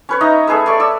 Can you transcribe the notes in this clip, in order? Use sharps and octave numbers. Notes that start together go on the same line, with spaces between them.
C#4 B4 C#5
D#4 D#5 E5 A#5
A3 G#4 B4 E5
A3 C#5 D5 C#6
D5 E6